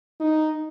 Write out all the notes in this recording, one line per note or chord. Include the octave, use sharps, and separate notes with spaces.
D#4